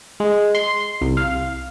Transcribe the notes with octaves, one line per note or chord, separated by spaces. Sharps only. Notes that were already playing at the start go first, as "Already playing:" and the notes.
G#3
C6
C2
F5